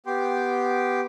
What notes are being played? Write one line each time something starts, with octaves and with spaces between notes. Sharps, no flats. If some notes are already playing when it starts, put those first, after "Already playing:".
B3 G4 G5 C6 D6